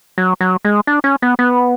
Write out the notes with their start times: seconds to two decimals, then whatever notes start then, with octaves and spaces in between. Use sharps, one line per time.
0.18 F#3
0.41 F#3
0.65 G#3
0.87 D4
1.04 C#4
1.22 B3
1.39 B3